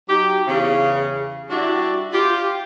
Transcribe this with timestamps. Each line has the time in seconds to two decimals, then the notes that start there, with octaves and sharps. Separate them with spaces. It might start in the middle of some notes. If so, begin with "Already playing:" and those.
0.09 F#3 D#4 G4
0.47 E2 C#3
1.50 G3 D4 E4 F#4 D5
2.13 F4 G4